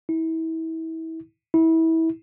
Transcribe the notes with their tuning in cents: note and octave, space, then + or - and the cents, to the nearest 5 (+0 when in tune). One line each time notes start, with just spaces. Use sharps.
E4 -30
E4 -25